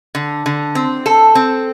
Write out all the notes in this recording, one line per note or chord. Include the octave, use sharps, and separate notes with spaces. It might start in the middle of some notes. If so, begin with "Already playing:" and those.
D3
D3
C4
A4
C4